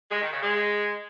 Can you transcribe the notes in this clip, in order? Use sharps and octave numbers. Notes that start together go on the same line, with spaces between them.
G#3
D#3
C#3
G#3